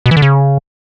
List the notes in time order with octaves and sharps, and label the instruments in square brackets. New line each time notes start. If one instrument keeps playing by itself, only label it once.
[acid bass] B2
E3
D3
C#3